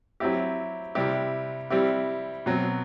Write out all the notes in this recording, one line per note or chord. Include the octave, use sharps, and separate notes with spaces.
F#3 C4 E4 G4
C3 G3 C4 E4 G4
G3 C4 E4 G4
B2 F#3 C4